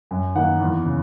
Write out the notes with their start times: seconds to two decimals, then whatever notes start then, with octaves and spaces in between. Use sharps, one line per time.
0.11 F#2
0.35 D#3 A#3 F#5
0.60 E2
0.86 C#3